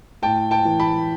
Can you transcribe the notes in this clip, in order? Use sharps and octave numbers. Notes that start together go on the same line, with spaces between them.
A2 G5 A5
G5 A5
E3
A5 B5